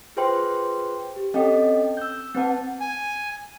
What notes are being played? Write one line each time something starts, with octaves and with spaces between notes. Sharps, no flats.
F4 G#4 B4 C5 G5 C6
G4
C4 C#4 A4 D#5 G5
E6 G6
C4 B4 F#5 A5
G#5